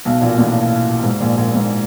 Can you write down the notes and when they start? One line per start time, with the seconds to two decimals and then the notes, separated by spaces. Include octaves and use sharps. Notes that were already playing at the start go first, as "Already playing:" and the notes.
0.05 B1 B2
0.21 A#1 A#2
0.38 A1 A2
1.03 G#2
1.20 A#1 A#2
1.36 A#1 A#2
1.54 G#2